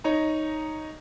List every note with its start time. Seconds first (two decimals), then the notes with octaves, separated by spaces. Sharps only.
0.04 D#4 C#5 D#5 A#5